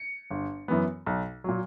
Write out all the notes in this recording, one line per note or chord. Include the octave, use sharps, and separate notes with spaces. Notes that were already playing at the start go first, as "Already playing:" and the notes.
Already playing: C#7
G1
F#2 E3 B3
B1
A#2 F#3